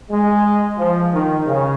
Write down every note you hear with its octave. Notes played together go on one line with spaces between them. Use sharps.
G#3
F3
D#3
C#3